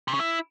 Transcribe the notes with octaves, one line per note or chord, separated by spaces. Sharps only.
C3
C#3
E4